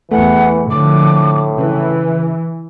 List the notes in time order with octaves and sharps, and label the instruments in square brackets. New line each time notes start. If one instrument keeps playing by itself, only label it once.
[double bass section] E2 [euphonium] E3 [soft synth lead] A3 [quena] F#5
[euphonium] A2 [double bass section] D3 F3 [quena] D6
[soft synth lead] C#3 [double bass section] E3 [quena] B4